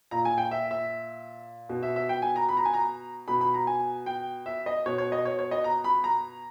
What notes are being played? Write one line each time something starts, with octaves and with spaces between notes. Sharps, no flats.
A#2 A#5
G#5
G5
E5
E5
B2
E5
E5
G5
G#5
A#5
B5
A#5
G#5
A#5
B2 B5
B5
A#5
G#5
G5
E5
D#5
B2 C#5
C#5
D#5
C#5
C#5
D#5
A#5
B5
A#5